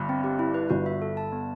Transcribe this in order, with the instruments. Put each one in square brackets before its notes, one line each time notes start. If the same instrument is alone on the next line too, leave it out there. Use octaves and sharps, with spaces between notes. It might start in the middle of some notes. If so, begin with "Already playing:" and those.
Already playing: [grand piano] G1 G2
[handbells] C4
G4
E4
B4
[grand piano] G1 G2 [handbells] F#4
[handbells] E5
A4
A5
B3